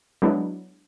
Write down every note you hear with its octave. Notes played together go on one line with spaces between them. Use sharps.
F#3 G#3 B3 D4 E4